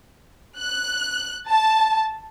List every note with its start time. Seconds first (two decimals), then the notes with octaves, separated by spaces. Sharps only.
0.59 F#6
1.50 A5